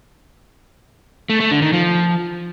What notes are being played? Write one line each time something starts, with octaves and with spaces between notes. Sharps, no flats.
A3
A3
D3
D#3
F3